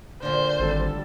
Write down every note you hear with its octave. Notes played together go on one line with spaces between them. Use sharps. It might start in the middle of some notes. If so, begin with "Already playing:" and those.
A#2 D3 C5
G#1 G3 A4